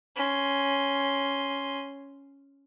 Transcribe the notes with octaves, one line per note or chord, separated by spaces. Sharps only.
C#4 C6